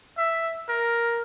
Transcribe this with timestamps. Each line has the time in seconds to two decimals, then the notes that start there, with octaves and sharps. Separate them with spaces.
0.18 E5
0.69 A#4